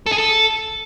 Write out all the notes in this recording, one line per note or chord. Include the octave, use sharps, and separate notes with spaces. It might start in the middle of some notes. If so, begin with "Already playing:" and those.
A4
G#4
A4